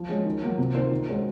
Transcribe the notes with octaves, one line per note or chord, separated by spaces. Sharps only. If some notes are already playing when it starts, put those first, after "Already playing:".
Already playing: F3
G#3 C#4 F#4
D#3
F#3 A#3 F4
C3
D#3 A#3 F4 C5
D#3
G#3 C#4 F#4 C5